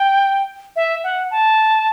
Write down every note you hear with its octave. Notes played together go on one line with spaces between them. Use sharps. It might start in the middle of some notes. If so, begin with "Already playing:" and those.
Already playing: G5
E5
F#5
A5